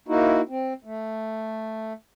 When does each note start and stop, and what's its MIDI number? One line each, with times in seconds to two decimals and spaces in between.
0.08 0.41 58
0.08 0.41 63
0.08 0.41 64
0.08 0.41 66
0.49 0.73 60
0.85 1.93 57